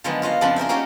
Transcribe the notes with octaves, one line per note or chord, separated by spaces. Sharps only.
D3 D#3 F3 F#3 G#3 B3
F4 F#4 D#5 F5
F2 C#3 F3 D4 B5
G#4 A#4 C5 E5
A#3 C#4 D#4 F#4 G4 C#5